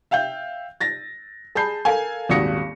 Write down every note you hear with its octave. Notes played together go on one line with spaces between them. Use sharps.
E5 F5 G5 G6
A6 A#6
G#4 A5 B5 G6 C7
A4 A#4 F5 G#5
D#1 G#1 F#4 D#6 A#6 C#7